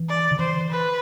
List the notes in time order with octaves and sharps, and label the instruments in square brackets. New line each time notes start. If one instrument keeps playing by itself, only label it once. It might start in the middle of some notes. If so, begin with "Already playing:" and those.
Already playing: [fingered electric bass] E3
[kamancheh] D5
[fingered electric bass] D3
[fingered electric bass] E3 [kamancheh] C5
[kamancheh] B4